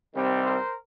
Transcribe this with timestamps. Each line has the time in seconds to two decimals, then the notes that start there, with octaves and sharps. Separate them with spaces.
0.14 C2 C3 D#3 G3 C4
0.44 A#4 C5